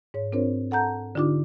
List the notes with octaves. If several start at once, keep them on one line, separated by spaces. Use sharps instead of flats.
G#2 C#5
C4 D4 F4 A#4 C5 C#5
A4 F#5 A5 A#5 G6
D3 D4 D#4 F4 G4 D6